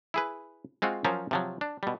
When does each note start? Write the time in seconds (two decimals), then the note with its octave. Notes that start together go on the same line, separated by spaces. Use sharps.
0.14 E4 G#4 B4
0.82 G#3 C4 F4 F#4
1.05 F3 F#3 C#4 F4 A#4 C5
1.31 C3 F3 F#3
1.61 D4
1.83 B2 G3